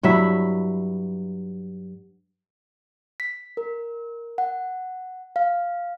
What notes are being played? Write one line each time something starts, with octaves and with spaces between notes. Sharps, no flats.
G2 F#3 E4 E5
B6
A#4
F#5
F5